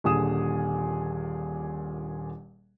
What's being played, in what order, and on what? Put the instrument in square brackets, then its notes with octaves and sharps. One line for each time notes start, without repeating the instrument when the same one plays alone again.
[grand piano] D#1 A#2 D3 G#4 D#6 E7